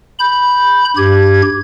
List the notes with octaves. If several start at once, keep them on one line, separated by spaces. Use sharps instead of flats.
B5 G6
G2 G4 G#6